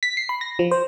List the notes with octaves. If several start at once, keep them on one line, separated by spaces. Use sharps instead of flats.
B6
C7
B5
A#6
F3
C5